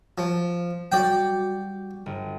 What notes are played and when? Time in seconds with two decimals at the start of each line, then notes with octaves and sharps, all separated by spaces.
0.18 F3
0.92 G3 F#4 D5 G5
2.06 G1